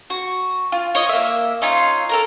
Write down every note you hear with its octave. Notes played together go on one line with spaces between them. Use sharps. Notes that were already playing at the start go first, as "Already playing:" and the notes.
F#4
F4
C#5 D#5
A#3 E5
C#4 D#4 F4
A4 A#4 A#5